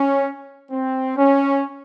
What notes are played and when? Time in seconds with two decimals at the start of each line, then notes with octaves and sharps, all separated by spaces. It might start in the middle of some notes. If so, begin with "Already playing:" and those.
Already playing: C#4
0.71 C4
1.16 C#4